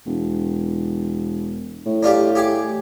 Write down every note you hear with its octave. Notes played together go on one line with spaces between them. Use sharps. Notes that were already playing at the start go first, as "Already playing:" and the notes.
E1
A2
D4 F4 G4
G4 G#4 D6